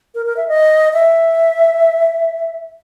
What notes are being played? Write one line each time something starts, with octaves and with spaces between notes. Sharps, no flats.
A#4
A#4
E5
D#5
E5